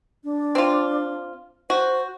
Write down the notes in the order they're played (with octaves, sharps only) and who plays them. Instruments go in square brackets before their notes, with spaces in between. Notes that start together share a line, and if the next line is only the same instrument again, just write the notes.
[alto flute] D4
[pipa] C4 F4
[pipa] F#4 [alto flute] C5